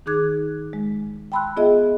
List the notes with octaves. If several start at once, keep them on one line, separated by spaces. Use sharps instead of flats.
D#3 D#4 G#4 D6 F#6 G#6
G#3
G5 A5 B5 C6 E6 F#6
B3 F4 G#4 D#5 E5